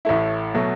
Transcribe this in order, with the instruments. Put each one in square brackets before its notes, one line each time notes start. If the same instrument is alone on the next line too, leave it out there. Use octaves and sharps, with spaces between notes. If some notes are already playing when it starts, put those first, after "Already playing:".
[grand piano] A1 A2 A3 E4
B2 F#3 A3